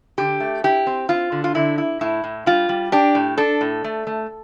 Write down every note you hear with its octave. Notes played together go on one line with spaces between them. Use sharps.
D3 G4
A3
E4 G4
C4
C4 F4
D3
F4
D3 E4
E4
A2 E4
A2
G3 F4
G3
D4 G4
A2
D4 A4
A2
A3
A3